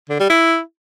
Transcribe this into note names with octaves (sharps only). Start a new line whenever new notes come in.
D3
G3
E4